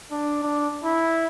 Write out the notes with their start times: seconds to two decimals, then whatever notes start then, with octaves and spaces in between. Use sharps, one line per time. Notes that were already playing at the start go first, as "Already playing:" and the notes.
0.11 D4
0.43 D4
0.84 E4